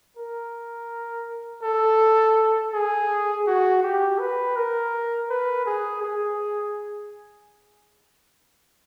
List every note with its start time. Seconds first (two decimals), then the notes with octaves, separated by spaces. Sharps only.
0.17 A#4
1.63 A4
2.73 G#4
3.47 F#4
3.83 G4
4.20 B4
4.56 A#4
5.30 B4
5.66 G#4
6.03 G#4